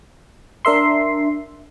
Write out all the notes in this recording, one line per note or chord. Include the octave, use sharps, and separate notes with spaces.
D4 A#4 E5 C6